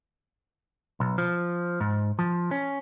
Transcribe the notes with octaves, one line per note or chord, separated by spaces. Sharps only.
B1
F3
G#2
F3
C#4